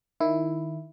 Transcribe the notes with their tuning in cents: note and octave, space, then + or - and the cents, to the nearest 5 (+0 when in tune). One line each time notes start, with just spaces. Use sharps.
D#3 +0 E4 +0